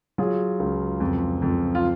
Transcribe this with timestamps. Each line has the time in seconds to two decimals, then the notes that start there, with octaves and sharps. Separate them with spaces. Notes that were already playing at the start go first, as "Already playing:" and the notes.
0.18 F#3 F4 G#4
0.59 C#2
1.00 F2
1.42 F2
1.75 F4